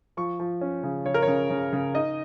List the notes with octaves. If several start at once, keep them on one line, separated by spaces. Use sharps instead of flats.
F3 C#6
F3
C#4
C#3
C#3 C#5
A#4
C#3 C#5
C#3
C#3
D#4 D#5